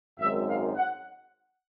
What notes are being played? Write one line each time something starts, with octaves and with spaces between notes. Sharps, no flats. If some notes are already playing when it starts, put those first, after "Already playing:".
G#1 F#2 D#3 G#3 E5
F5
F#5